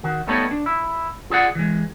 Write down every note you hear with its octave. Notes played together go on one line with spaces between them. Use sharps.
D#3 F#4
G3 A3 B3 D#4 A4 C#5
D4
E4
F4 G#4 D5 F#5
E3 G#3